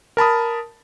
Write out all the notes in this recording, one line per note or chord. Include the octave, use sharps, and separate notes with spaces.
A#4 A5 B5 D#6